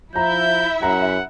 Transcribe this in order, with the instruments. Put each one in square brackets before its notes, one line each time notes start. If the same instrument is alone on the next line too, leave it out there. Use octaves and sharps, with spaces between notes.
[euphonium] F3 [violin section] E4 E5 [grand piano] A#5 [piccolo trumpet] G6
[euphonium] F#2 [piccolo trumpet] F#5 [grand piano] A#5